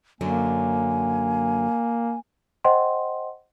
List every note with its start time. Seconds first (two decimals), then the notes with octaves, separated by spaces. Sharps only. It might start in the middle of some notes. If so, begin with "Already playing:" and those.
0.21 F#2 D3 F#3 A#3 G#5
2.64 C5 D#5 F#5 G5 C6